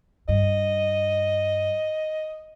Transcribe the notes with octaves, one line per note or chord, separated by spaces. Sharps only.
G2 D#5